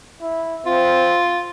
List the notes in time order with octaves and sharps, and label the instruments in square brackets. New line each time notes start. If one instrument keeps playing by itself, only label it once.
[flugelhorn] E4
[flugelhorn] C4 [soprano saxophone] F4